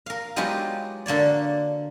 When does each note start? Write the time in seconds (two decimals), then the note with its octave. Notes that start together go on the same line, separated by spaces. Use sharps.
0.06 A#4 F5
0.36 F#3 G#3 B3 D#4 F4 G4
1.06 D3 A#3 C#5 D5